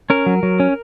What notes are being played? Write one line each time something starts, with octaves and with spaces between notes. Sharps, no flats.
C#4 A#4
F#3
F#3
C#4